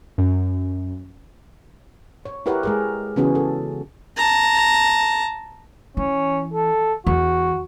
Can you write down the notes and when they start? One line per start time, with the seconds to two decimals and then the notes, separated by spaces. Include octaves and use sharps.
0.18 F#2
2.25 C#5
2.46 E4 G4 A#4 B4 C#5 F#5
2.63 G#3 G#4 A#4
3.16 C#3 E3 B3 C#4 F#4 G#4
3.35 A4
4.18 A5 A#5
5.97 E3 C#4
6.54 A4
7.07 E2 F#4